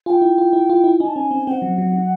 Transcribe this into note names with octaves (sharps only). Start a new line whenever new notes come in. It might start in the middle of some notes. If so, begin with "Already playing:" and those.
F4 G5 G#5
E4
F4
E4
F4
E4
D#4 G#5
A5
C#4 G#5
C4
C4 F#5 G5
F#3
F#3
F#3